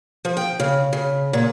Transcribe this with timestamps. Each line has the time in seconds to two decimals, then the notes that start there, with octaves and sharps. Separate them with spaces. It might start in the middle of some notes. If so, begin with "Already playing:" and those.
0.25 F3
0.37 G5
0.60 C#3
0.93 C#3
1.33 A#2